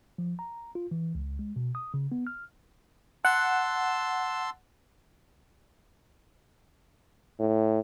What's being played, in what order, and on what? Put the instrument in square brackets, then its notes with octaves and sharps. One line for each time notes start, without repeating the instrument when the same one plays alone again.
[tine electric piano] F3
A#5
F4
E3
C#2
G#3
B2
D#6
C#3
B3
F6
[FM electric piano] F#5 [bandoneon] A5 C6 E6
[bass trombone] A2